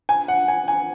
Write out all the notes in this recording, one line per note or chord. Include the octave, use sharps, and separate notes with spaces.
G#5
F#5
G#5
G#5